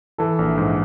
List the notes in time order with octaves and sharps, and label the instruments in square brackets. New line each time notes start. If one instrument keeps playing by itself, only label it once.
[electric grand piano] E3 [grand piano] A4
[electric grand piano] A#1
G#2